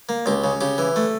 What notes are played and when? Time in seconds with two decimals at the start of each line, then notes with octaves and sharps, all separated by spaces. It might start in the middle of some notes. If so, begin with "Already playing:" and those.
0.09 A#3
0.26 C#2 G4
0.44 C#3
0.61 C#3 G4
0.78 E3
0.96 A3